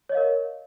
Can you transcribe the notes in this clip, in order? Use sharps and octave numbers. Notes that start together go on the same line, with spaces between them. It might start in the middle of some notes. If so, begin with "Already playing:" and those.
A#4 C#5 D#5 F5